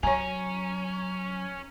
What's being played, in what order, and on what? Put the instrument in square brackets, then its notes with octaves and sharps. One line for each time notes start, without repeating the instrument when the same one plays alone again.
[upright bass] F#3 [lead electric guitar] C#4 [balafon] C#5 G#5 [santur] A#5 C#6